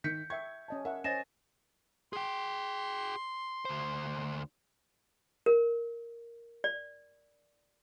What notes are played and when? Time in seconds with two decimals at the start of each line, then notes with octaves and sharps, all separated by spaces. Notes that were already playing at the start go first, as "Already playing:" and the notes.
0.04 D#3 G6 B6 C#7
0.30 E5 G5 C#6 G#6
0.68 C#4 D#5 A5
0.85 A#4 E5 F#5
1.04 C#4 C5 D#5 G#5 A6 A#6 E7
2.13 G#4 G5 C6
3.65 D2 C5
5.46 A#4
6.64 D5